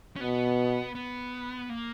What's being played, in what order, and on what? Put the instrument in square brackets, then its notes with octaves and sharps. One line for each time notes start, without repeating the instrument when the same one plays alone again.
[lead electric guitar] C#4
[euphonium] B2 [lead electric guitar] B3
[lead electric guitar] B3
A#3